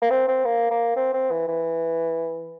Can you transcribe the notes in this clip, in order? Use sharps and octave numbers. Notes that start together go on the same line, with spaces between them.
A#3
C4
C4
A#3
A#3
C4
C4
E3
E3